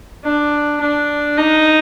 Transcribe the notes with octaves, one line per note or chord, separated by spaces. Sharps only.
D4
D4
D#4